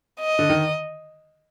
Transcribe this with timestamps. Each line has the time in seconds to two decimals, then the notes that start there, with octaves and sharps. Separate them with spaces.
0.20 D#5
0.39 D3
0.49 D#3